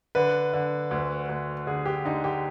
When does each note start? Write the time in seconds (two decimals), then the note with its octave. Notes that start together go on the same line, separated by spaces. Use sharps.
0.15 D3 B4
0.53 D3
0.91 D2
1.29 D2
1.67 D3 G#4
1.86 G4
2.05 D3 D#4
2.24 G4